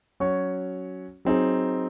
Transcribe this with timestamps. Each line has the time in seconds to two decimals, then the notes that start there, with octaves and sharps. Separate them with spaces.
0.20 F#3 C#4 F#4 C#5
1.25 F#3 C4 D#4 G#4